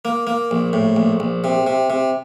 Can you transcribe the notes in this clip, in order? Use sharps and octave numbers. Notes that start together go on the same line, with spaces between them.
A#3
A#3
A#1
A2
A#1
A#1
C3
C3
C3